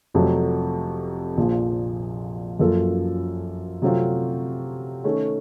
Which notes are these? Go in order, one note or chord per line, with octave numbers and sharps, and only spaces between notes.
F1 F2 C3 F#3 A3
A#1 A#2 F3
F#2 F3 A#3 F4 A4
C3 F#3 A3 C4 F4
D#3 A3 C#4